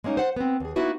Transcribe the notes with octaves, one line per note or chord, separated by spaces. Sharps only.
G#3 A#3 C#4 D#4
C5 F#5
B3 C4
D#2 G#4
A#3 B3 D#4 E4 F#4 B4